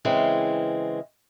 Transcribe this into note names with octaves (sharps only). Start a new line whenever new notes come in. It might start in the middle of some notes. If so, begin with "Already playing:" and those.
C#3 E3 G#3 C4